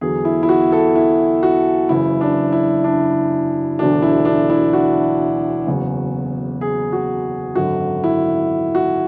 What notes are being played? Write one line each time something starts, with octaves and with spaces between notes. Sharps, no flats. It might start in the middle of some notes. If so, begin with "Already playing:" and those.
E2 D3 F#3 G#4
E4
E4
F#4
A4
E4
F#4
F#1 F#2 C#3 E3 E4
D4
E4
D4
E1 D2 D3 F#3 D4
E4
D4
E4
F#4
F#1 E2 C#3
G#4
F#4
G#1 F#2 D3 F#3 F#4
E4
F#4